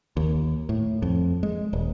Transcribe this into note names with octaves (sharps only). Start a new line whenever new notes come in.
D#2
A2
F2
G#3
D#1